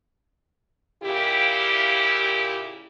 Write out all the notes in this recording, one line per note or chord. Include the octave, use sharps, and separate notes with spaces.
A#2 C#3 E4 G4